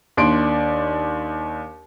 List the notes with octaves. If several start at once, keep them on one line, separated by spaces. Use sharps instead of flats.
D#2 D4 D5 C6 D7